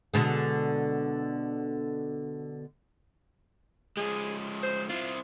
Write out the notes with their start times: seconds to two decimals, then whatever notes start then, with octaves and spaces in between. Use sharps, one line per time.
0.14 B2 D3 G#3
3.97 F3 G#3 G#4
4.63 C5
4.89 C4 E4 F4